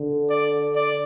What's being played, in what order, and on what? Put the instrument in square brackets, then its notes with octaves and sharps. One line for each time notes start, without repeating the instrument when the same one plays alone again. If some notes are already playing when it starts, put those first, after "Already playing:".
Already playing: [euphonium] D3
[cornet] D5
D5